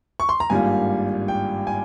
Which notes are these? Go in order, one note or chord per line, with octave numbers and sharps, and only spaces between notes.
C#6
C6
A#5
G#1 G2 G3 A#3 F4 G#5
G5
G#5